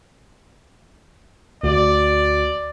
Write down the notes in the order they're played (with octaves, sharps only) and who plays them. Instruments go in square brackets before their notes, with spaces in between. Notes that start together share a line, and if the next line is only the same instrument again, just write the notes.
[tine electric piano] D2 F#4 [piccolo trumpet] D5